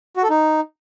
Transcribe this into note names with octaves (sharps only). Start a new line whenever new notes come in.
F#4
A4
D#4